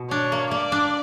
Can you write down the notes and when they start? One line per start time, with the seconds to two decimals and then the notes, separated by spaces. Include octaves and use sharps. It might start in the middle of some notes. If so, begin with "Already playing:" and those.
Already playing: B2
0.11 D4 C#5
0.32 A#3
0.51 A#3 D5
0.72 D4